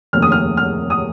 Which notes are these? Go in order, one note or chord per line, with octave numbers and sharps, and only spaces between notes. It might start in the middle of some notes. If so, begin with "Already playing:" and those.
F1 D#2 C#3 F6
D#6
F6
F6
D#6